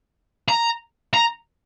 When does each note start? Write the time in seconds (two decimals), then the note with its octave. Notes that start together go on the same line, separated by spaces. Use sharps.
0.49 A#5
1.14 A#5